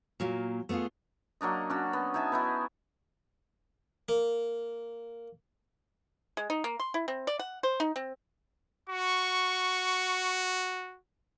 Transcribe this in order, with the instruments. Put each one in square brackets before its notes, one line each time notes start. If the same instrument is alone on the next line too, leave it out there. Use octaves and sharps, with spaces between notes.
[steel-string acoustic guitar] A#2 F#3 A#3
A3 B3 E4 F4 G#4
[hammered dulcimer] F#3 A#3 D4 D#5
C#4 D4 F#4
B3
D#4 E5 G#5 A5
B3 D#4 E4
[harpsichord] A#3
[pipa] G#3
D#4
A#3
C6
E4
C4
D5
F#5
C5
D#4
C4
[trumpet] F#4 [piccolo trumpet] C#6